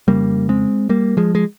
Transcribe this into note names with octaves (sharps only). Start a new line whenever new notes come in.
F2 C#3 G3 A#3
G#3 C4
G3 A#3
F3 G#3
G#3